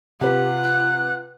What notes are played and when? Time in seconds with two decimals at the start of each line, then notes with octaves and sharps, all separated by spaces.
0.21 C3 F4 G4 B4 F#5
0.64 F#6